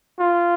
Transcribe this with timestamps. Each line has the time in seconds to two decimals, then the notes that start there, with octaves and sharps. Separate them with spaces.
0.19 F4